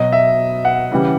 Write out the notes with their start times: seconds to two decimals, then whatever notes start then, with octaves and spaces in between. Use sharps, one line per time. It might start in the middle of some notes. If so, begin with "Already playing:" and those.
Already playing: B2 F#3 D#5
0.12 E5
0.65 F#5
0.91 C#3 E3 G3